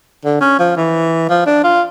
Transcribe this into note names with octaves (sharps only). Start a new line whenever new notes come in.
D3
C#4
F3
E3
F3
D4
F4